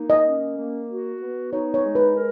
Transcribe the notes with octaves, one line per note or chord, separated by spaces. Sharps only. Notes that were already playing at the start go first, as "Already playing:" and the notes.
Already playing: A#3 D#4
D#5
C#4
A#3
F#4
B3
D#4 C#5
C#5
G#3
B4
A#4